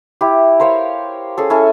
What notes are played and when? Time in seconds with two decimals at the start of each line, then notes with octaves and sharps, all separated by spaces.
0.21 E4 G4
0.60 A#4 C5 C#5 F5
1.38 C#4 G#4 A4
1.50 C#4 E4 A4 G#5